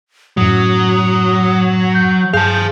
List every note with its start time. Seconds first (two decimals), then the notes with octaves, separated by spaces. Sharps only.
0.37 F#2 A2 F#3 D#6
1.95 G6
2.34 G2 G#4 F5 A5 G6